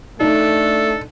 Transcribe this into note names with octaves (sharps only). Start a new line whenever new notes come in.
A3 D4 D#4 A4